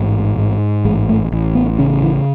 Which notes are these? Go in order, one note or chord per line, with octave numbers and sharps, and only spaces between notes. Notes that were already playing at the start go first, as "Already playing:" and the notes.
Already playing: A1 G#2
G#2
A1 G#3
A3
A1
B3
C#3 C#4
E3